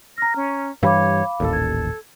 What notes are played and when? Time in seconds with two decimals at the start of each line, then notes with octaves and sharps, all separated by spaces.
0.18 A#5 F6 A#6
0.36 C#4
0.83 G2 E3 G3 C#5 F5 B5 D6
1.40 D#1 A1 D#2 A4
1.53 G#6